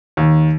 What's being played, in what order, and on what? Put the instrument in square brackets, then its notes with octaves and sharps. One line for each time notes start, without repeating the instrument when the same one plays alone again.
[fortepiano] D#2